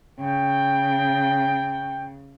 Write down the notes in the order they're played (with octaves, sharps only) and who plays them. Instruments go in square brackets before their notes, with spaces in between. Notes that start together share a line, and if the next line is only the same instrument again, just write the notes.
[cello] C#3 [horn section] G5